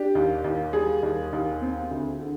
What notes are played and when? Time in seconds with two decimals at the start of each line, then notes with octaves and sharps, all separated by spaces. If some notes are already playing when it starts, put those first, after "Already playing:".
Already playing: D4 G4
0.15 D#2
0.44 D#2
0.73 G3 G#4
1.03 D#2
1.33 D#2
1.61 C4
1.91 D2
2.20 D3